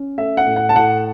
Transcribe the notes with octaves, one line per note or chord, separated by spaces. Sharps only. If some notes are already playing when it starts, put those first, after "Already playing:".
Already playing: C#4
A3 E5
F#5
A2
F#5
A5
A2 F#5